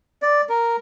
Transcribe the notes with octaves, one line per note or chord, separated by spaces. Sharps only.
D5
A#4